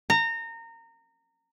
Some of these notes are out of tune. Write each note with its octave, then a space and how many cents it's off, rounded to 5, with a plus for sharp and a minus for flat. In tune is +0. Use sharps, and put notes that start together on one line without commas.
A#5 -25